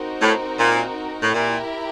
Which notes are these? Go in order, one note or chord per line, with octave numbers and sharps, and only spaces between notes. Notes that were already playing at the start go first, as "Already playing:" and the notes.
Already playing: C4 D#4 F#4 A#4
A2
A#2
A2
A#2 E4 G4 A#4